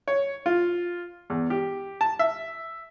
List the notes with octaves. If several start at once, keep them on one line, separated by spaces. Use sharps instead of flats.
C#5
F4
E2
G4
A5
E5